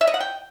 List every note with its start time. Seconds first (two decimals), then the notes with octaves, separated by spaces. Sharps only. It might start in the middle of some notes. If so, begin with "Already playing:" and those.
0.01 E5
0.07 D#5
0.14 F#5
0.20 G5